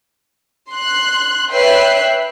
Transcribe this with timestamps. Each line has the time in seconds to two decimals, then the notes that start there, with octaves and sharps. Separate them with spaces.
0.71 C6 F#6
1.51 B4 C#5 E5 G5 F#6 C7